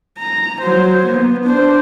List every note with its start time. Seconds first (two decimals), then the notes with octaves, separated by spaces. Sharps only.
0.19 A#5
0.61 F#3 C5
1.05 B3
1.44 D4 C5